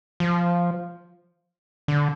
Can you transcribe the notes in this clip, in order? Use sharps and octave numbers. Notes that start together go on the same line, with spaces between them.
F3
D3